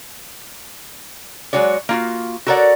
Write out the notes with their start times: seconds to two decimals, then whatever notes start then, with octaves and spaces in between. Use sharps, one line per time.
1.53 F#3 G#3 F#4 C#5 D5
1.89 A#3 F4 F#4
2.47 F#4 A4 A#4 C#5 D5 F#5